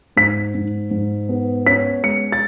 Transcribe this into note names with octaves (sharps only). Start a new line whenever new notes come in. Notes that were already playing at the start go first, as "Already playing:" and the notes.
G#2 B6
G#2
G#2
B3
C#4 B6
G#3 C#7
A6